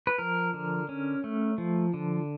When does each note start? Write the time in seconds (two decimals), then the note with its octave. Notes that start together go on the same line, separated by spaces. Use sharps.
0.07 B4
0.18 F3 A#4
0.54 D3
0.89 C#4
1.24 A3
1.58 F3
1.94 D3